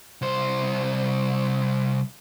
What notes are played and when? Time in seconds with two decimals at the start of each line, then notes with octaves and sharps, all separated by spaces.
0.22 C2 C5